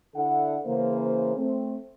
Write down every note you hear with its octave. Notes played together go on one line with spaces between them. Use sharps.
D3 D4 E4 A4 E5 F#5
C#3 E3 A#3 C5
A3 C4